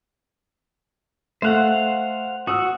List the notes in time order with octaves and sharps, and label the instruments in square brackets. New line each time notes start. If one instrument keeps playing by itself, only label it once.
[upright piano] A3 F#6 [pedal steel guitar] C5 F5 F#5
[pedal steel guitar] F#4 [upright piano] D#6 E6